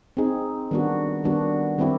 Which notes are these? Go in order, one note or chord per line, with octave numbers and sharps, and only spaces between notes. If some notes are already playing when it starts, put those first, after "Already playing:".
C4 D#4 G#4
D#3 G3 B3 D4 F#4
D#3 G3 B3 D4 F#4
D#3 G3 C4 E4 G4